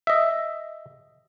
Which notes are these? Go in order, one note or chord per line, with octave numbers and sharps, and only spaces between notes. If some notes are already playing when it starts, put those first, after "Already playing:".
D#5 E5